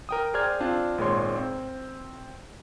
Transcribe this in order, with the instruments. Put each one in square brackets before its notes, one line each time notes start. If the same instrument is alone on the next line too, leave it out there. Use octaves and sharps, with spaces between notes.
[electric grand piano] A#4 G5 D#6
G#4 C5 D5 G5 F6 G#6
C4 D4 F4
G#1 A#2 G#3 C#5 C6
C4